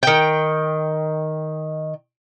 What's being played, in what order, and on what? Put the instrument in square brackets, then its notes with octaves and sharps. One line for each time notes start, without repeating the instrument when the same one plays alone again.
[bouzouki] D#3 G5